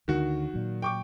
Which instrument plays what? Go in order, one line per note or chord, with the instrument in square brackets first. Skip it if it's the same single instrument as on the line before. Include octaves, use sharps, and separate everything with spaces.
[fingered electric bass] D2 D3 [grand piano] D#3 F#4
[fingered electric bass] A#2 F#3
[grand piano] G5 C#6 D6